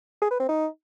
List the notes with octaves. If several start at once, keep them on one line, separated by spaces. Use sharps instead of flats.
G#4
B4
C4
D#4